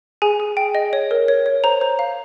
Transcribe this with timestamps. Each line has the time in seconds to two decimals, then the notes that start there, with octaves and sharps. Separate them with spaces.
0.22 G#4 G#5
0.40 G#4
0.57 G5
0.75 D#5
0.93 C#5
1.11 A#4
1.28 C#5
1.46 C#5
1.64 C5 A#5
1.81 C5
1.99 F5